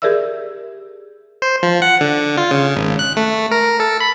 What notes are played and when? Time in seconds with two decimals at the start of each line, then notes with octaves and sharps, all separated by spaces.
0.02 G4 G#4 A#4 D5 E5 E6
1.42 C5
1.63 F3
1.82 F#5
2.01 D3
2.37 F4
2.51 C#3
2.76 G#1
2.99 F#6
3.17 A3
3.51 A#4
3.80 A4
4.00 B5